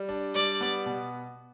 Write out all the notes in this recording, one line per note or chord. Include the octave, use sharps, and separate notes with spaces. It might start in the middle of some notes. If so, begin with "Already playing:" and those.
Already playing: G3
D4
G3 D5
B3
B2